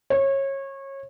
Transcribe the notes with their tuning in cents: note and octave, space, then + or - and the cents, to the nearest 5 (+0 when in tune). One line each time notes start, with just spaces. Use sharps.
C#5 -25